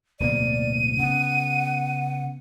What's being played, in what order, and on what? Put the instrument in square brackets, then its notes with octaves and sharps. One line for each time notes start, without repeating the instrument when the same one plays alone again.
[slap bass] D1 B2 A#3 [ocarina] D5 [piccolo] D#7
[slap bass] C#3 B3 [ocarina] F#5